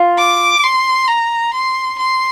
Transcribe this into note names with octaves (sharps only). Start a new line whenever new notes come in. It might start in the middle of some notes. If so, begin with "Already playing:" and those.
Already playing: F4
D6
C6
A#5
C6
C6